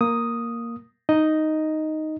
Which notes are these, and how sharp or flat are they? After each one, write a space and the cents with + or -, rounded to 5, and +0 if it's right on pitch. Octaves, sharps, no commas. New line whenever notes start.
A#3 +0 D#6 +0
D#4 +0 D#5 +0